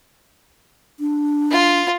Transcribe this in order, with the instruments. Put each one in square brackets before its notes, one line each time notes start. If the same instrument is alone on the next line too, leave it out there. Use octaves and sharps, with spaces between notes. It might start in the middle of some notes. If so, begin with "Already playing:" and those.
[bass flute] D4
[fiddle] F4